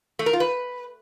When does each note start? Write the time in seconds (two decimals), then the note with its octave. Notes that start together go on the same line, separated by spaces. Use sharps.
0.19 A3
0.26 A#4
0.33 F4
0.40 B4